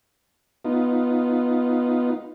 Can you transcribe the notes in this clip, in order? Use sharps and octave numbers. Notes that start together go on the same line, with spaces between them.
B3 D#4 F4